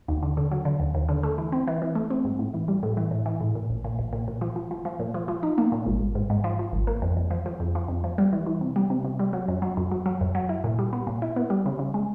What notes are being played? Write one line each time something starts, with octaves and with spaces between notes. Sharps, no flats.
D#2
D3
D3
F#3
D3
D#2
D#2
D3
A3
E3
C4
E3
E3
A3
C4
G#2
A2
E3
G3
A2
E3
A2
E3
A2
A#2
A#1
A#2
A#1
A#2
A#2
F3
F3
F3
F3
A#2
F3
F3
D#4
A#3
A#2
G#1
G#1
G#2
G#2
F3
F3
G#1
A#3
F2
F2
F3
F3
F2
F3
F2
F3
G3
E3
E3
C3
G3
C3
C3
G3
F#3
F#2
F#3
F#2
F#3
F#3
F#2
F#3
E4
A#2
G3
B3
A#2
E4
B3
G3
C#3
C#3
G#3